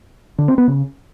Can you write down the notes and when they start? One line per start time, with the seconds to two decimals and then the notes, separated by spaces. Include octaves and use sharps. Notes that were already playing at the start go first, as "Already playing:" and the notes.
0.38 D3
0.48 C4
0.58 B3
0.68 C#3